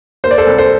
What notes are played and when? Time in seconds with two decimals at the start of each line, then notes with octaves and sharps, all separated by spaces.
0.24 A#3 C5
0.31 D5
0.38 A4 C5
0.47 C2
0.58 A4 C5